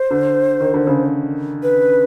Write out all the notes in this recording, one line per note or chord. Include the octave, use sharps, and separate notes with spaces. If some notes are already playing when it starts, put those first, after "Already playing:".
Already playing: C5
D3
D#3
D3
C#3
B4